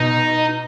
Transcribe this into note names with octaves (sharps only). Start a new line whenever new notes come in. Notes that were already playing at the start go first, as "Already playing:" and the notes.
Already playing: B2 D#4